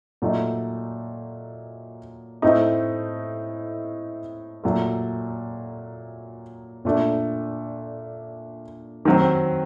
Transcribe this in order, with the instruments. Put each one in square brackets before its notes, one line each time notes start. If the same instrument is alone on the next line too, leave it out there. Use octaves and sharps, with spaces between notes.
[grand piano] A#2 F#3 A3 D#4
A2 A3 C4 D#4
A#2 F#3 A3
A#2 A3 D4
D#3 F#3 C4